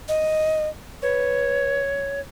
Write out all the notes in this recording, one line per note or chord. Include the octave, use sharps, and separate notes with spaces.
D#5
B4 C#5